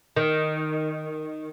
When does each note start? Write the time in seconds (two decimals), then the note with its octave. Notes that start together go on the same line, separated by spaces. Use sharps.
0.16 D#3